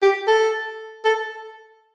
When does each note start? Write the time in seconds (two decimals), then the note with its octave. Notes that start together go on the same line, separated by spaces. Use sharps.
0.02 G4
0.27 A4
1.05 A4